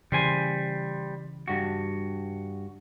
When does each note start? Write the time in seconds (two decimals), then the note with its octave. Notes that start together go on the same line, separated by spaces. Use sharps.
0.12 C#3 E3 G3 C5 G#5
1.48 G2 F#4